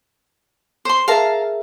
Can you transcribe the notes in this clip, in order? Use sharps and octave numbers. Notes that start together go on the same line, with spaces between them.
C5 C6
G#4 A#4 E5 F5 A5 A#5